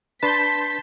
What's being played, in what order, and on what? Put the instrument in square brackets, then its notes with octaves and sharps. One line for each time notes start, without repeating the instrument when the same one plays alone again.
[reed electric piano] D4 B4 B5 [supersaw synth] A5 C6 G6 [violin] B6